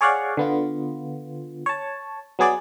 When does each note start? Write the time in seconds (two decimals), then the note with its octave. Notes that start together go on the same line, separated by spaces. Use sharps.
0.01 G#4 C#5 D5 F5 F#5 C#6
0.37 D3 B3 F4
1.66 C#5 A5
2.39 F#3 B3 G#4 D5